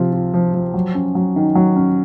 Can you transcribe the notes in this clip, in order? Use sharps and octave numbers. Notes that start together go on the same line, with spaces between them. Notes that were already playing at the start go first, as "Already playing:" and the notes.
Already playing: C3 F3 F4
F4
F3
F3
F#3
C#4
F#3
D#3
F#3
C#4